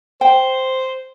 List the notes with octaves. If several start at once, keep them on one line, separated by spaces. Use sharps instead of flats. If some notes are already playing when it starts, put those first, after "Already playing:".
C5 G5